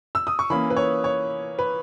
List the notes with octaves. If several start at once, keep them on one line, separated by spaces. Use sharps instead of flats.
E6
D#6
C#6
E3 A#3 C#4 B5
B4
C#5
C#5
B4